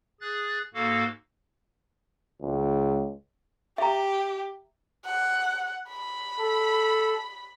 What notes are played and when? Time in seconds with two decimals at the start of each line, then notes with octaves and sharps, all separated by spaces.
0.21 G#4 F#6 A6
0.74 G#2 A#3 F#4 A4 F5
2.42 C#2
3.78 G4 E5 A#5
5.06 F#5
5.89 B5
6.39 A4